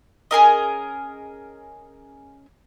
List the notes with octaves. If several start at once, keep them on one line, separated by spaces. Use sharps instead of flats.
C#4 G#4 A#4 D#5